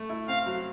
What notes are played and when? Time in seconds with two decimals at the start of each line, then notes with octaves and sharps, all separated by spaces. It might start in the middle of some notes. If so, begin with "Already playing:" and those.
Already playing: A3
0.09 E4
0.28 C4 F5
0.46 F#3